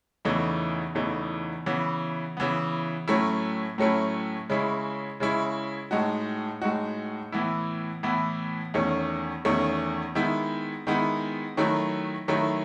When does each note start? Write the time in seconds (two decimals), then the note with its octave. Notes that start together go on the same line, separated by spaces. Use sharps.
0.25 E2 C#3 E3 A3 D#4
0.95 E2 C#3 E3 A3 D#4
1.66 C#3 E3 B3
2.37 C#3 E3 B3
3.08 A2 F#3 A3 C#4 E4
3.78 A2 F#3 A3 C#4 E4
4.50 C#3 G#3 C#4 E4
5.20 C#3 G#3 C#4 E4
5.91 A2 G#3 D#4 F#4
6.62 A2 G#3 D#4 F#4
7.32 A2 E3 B3 E4
8.03 A2 E3 B3 E4
8.74 E2 D#3 A3 C#4
9.45 E2 D#3 A3 C#4
10.15 D#3 G#3 B3 E4
10.87 D#3 G#3 B3 E4
11.57 D#3 F#3 A3 E4
12.28 D#3 F#3 A3 E4